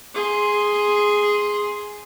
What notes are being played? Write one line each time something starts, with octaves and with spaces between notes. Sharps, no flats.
G#4 C6